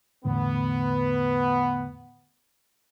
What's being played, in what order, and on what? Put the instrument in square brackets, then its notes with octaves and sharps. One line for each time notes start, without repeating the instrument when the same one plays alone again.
[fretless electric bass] E2 A2 D3 [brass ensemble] B3